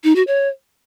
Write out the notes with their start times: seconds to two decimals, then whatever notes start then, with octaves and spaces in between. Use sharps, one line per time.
0.04 D#4
0.16 F#4
0.27 C#5